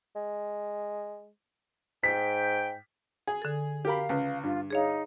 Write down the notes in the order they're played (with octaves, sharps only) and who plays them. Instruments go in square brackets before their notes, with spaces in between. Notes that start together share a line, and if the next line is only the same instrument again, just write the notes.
[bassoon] G#3
[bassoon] G#2 [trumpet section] G5 [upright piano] B6
[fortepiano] G#4
[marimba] D3 A4
[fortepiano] G4 A#4 B5 [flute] F5
[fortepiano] C#2 [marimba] B4
[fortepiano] G2 [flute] F4
[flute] D#4 [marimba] G#4 C#5 F5